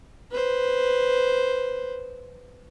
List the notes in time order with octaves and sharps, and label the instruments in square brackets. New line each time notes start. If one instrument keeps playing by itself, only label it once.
[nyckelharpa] B4 C5